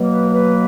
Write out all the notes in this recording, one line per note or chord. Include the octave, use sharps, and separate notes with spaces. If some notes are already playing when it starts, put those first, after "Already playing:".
Already playing: B2 F#3 A#3
B4
B4